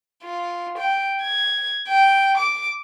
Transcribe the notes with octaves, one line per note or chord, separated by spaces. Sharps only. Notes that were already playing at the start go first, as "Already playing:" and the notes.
F4
G5
G#6
G5
D6